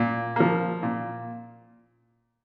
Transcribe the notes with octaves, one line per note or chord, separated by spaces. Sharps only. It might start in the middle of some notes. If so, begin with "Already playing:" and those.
Already playing: A#2
F3 A#3
A#2